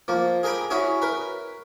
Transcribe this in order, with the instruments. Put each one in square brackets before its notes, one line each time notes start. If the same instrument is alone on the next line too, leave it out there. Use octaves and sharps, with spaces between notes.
[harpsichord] F3 A#3
G#4 A#4 G5 A#5 B5
C#4 E4 F#4 G#4
A#4 B4